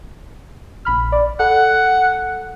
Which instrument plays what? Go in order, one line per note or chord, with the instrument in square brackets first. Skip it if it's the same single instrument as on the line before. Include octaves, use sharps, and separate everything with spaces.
[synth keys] A#1 B5 F6
D5
[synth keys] A4 [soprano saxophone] F#5